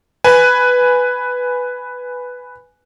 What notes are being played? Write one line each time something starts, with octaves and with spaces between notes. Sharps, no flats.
B4 G#5